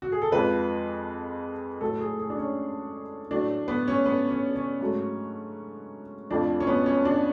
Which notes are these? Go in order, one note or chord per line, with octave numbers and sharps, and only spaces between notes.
F#4
G#4
A4
F2 F3 G#3 B4
A2 F#3 A3 A4
G#4
G#4
D4
C#4
A2 F#3 A3 D4
B3
C#4
B3
C#4
C#4
G#2 F#3 A3
F2 F3 A3 D4
C#4
B3
C#4
D4